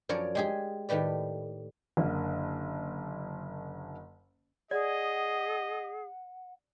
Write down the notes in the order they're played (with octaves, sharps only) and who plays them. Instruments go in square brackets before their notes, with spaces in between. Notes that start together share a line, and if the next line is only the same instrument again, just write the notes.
[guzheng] F#2 F3 A#4 C#5 D5
G#3 G4 G#4
A2 D#3 G4 B4 D5
[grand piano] F#1 D3 A#3
[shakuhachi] G#4 [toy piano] D5 [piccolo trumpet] D#5 [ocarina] F#5